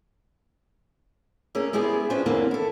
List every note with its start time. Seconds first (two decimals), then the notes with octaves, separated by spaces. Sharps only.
1.55 A3 A#3 C#4 G#4
1.73 G#3 B3 E4 G4 G#4
2.10 C#4 D4 F4 B4 C5
2.26 E2 D3 E3 A#3 C4 C#4
2.51 E4 A4